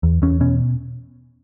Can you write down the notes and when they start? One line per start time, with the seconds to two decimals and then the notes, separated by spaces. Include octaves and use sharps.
0.03 E2
0.22 E2 C#4
0.40 B2 C#4